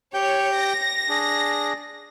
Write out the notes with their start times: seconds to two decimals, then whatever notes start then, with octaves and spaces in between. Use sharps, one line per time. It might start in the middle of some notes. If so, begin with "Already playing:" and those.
0.14 G4 C#5 G5 G6
0.57 A#6
1.09 D4 G#4